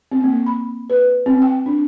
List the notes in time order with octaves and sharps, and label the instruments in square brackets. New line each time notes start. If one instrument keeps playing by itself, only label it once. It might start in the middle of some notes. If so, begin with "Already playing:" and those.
[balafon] C4
A#3
B5
B4
C4
G5
D4